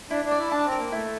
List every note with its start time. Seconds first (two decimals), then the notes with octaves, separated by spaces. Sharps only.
0.10 D4 E4
0.25 D4
0.31 D5
0.38 E4
0.51 D4 A5
0.65 C4
0.72 A#4
0.78 A#3
0.92 A3 E4